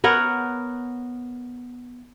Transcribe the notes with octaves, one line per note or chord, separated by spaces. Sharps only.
B3 A#4 C#5 F#5